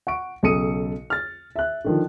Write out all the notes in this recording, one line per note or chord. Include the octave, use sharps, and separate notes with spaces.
F#5 C#6 D7
B1 C#3 A4 D#6 C#7 D#7
F6 A6
E5 F#6
D3 D#3 F3